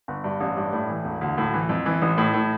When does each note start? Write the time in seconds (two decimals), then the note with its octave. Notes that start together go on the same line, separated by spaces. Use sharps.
0.08 G1
0.24 G2
0.40 A1
0.57 G2
0.73 A2
0.89 E3
1.05 E1
1.21 D2
1.38 A2
1.54 E3
1.69 F2
1.86 E3
2.02 A1
2.18 A2
2.34 A2